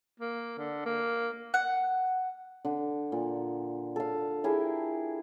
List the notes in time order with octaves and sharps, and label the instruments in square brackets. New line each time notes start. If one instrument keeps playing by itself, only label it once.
[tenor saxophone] A#3
D3
A#3
[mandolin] F#5
[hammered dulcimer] D3
A#2
A4 F5
E4 G4 G#4 A#4